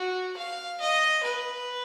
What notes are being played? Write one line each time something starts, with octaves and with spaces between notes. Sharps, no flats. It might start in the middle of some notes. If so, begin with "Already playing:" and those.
Already playing: F#4
F5
D#5
B4